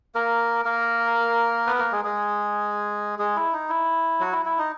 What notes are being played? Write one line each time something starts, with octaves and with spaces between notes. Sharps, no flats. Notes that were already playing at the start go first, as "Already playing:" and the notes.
A#3 A#4
A#3 A#4
B3 B4
A#3 A#4
G#3 G#4
G#3 G#4
G#3 G#4
E4
D#4
E4
F#3 F#4
E4
E4
D#4